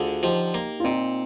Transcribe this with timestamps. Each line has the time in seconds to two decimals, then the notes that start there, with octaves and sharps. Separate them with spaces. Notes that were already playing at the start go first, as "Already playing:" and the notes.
Already playing: D2 D3 F4 G#4
0.23 F3 D#4 G4
0.54 A#3
0.80 F4
0.84 A#2 C4 D#4